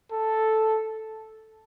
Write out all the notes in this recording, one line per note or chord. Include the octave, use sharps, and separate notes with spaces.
A4